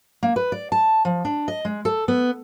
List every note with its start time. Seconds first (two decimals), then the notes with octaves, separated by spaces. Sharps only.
0.23 A#3
0.36 B4
0.52 D5
0.72 A5
1.05 F3
1.25 D4
1.48 D#5
1.65 G#3
1.85 A4
2.08 B3